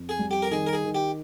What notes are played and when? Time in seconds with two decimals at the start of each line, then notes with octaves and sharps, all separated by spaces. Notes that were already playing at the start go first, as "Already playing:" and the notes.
Already playing: F2
0.09 G#4
0.19 G3
0.31 G4
0.42 A#4
0.51 D#3 G#4
0.67 A#4
0.73 G#4
0.84 D#3
0.95 G4